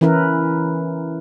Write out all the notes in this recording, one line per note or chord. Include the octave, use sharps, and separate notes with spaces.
E3 C#4 E4 A#4 B4